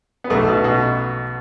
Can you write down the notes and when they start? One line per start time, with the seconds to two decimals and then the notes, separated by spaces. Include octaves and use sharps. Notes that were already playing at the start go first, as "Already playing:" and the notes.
0.24 B3
0.30 B1 A3
0.48 B2
0.64 B2